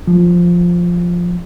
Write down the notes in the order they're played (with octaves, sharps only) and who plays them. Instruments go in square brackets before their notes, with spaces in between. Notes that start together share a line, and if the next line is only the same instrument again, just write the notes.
[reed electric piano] F3